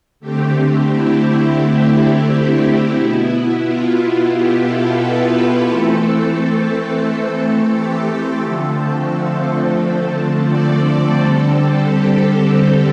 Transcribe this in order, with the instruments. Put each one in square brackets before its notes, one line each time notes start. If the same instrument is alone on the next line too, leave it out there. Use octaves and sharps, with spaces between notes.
[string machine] D3 A3 C4 G4
E4
B2 B3
F4
G4
A4
B4
E3 A3 C4 A4
G4
D3 F3 A3 C4 A4
D5
D3 G3 C4 A4
G4
G4